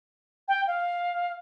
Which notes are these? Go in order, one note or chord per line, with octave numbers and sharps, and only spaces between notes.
G5
F5